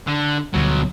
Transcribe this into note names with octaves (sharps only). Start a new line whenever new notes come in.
D3
D2 B2 D3 F#3 G3